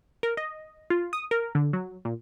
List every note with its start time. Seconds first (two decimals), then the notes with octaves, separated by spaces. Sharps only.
0.23 A#4
0.37 D#5
0.90 F4
1.13 D#6
1.31 A#4
1.55 D3
1.73 F#3
2.05 A#2